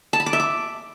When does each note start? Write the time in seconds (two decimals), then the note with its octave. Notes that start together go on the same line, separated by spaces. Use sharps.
0.13 A5
0.20 B5
0.26 D6
0.33 E5
0.40 D6